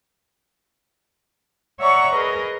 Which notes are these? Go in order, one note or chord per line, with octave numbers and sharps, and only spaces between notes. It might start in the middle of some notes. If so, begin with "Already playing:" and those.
C#5 D5 E5 F#5 A#5 C#6
G#4 A#4 B4 D#5